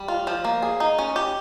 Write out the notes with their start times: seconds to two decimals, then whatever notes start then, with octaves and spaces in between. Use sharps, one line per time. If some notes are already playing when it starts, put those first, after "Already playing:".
Already playing: G3
0.08 F4
0.27 F3
0.44 A#3
0.62 G#4
0.80 D#4
0.98 C#4
1.16 G4